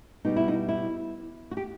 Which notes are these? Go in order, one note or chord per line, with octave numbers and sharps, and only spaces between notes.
B2 G3 B3 D#4
E4
D#4
E4
F#4
G4